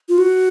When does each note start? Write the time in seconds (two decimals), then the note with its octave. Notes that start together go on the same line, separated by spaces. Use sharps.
0.09 F4
0.18 F#4